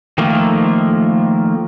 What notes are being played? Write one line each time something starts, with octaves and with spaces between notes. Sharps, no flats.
D#3 F3 A3 A#3